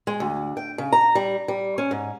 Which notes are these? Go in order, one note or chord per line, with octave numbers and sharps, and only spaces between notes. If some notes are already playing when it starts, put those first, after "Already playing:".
G#3
D2
G5
C#3
A#5
G3
G3
C#4
G#2